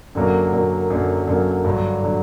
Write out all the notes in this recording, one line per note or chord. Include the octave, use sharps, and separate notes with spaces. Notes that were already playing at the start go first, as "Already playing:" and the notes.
F#2 D3 F#3 A#3
F#2 D3 F#3 A#3
F#2 D3 F#3 A#3
F#2 D3 F#3 A#3
G2 D3 F#3
D3 F#3